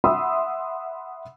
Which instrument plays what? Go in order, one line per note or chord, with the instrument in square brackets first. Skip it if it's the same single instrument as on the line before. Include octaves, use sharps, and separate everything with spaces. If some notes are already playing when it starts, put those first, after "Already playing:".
[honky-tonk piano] E5 F#5 B5 C6 D#6 E6